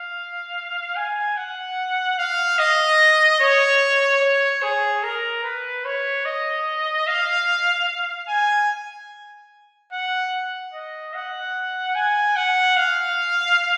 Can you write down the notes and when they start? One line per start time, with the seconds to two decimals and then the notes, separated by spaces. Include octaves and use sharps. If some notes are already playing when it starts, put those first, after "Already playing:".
Already playing: F5
0.96 G#5
1.37 F#5
2.18 F5
2.58 D#5
3.40 C#5
4.22 C#5
4.62 G#4
5.03 A#4
5.44 B4
5.85 C#5
6.25 D#5
7.07 F5
8.28 G#5
9.92 F#5
10.74 D#5
11.14 F#5
11.95 G#5
12.36 F#5
12.77 F5